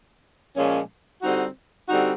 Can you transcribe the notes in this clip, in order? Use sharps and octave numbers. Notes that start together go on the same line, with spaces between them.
A#2 F3 G#3 C#4
D3 G3 C4 D#4 F#4
D3 G3 C4 D#4 F#4